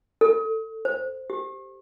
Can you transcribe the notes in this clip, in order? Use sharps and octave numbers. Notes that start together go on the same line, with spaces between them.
A4
C5
G4